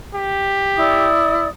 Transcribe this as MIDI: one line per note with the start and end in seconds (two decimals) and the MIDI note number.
0.15 1.10 67
0.77 1.48 64
0.77 1.48 74
0.77 1.48 87